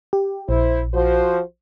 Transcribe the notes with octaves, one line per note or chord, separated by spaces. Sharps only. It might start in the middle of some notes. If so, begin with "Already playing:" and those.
G4
A#1 E4 C5
F3 F#4 C5